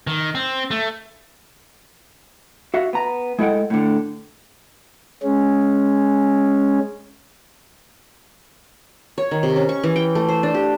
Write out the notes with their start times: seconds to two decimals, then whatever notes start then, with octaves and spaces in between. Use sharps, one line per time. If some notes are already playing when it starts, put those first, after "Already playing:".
0.07 D#3
0.35 C4
0.71 A3
2.74 F#4 E5 F5
2.93 B3 A#5
3.39 G#3 E4 A4 F#5 G5
3.70 A2 D3
5.23 G#3 C#4
9.18 C#5
9.31 D#3
9.43 C3
9.56 C#4
9.69 C#6
9.84 E3
9.96 G5
10.15 A3
10.28 C5
10.43 D4
10.54 G4